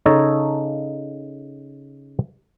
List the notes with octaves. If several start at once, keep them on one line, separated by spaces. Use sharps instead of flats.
C#3 D#4 A4 C#5 A5 A#5